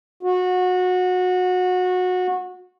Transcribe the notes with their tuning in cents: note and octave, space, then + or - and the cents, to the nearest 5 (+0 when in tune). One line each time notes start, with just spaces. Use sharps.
F#4 -20